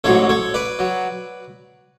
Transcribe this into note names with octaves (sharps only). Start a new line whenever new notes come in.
A1 G#2 F#3 A4 C#5
A4 C#5
B4 D5
F#3